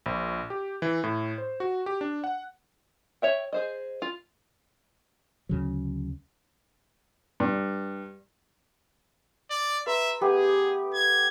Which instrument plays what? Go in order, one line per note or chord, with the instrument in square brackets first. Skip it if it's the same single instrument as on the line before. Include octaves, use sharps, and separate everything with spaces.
[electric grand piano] A#1
G4
E3
A2
C5
F#4
G4
D4
F#5
[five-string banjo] C#5 E5 G5
G#4 C5 D#5
F4
[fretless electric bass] D2 C#3 F#3
[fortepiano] G2
[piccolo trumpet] D5
[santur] B4 A#5 C6 [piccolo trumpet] E5
[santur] A3 B3 G4 [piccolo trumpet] G#4
[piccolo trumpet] G#6